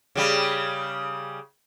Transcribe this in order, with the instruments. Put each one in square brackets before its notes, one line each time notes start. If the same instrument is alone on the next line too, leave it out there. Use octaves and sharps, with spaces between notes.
[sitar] C#3 G3